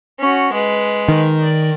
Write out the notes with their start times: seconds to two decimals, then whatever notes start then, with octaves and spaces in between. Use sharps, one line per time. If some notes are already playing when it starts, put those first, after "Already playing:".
0.20 C#4 F#4
0.53 G#3 B4
1.08 D#3
1.43 D5